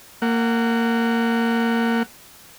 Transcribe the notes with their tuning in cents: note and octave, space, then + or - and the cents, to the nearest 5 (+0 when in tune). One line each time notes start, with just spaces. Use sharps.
A#3 -20 F#5 +10